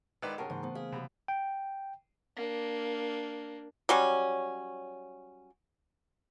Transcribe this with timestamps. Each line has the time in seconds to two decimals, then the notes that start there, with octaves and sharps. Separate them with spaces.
0.22 G#1 D#3 B4 D5
0.38 G2 C#3 A#4 F#5 A5 C#6
0.50 G#2 C#3 E3 A#3
0.63 A3 B3 C5
0.75 G#4 F5
0.92 F#2 C3 G4 B5
1.28 G5
2.36 A#3 D4
3.89 F#3 G3 C#4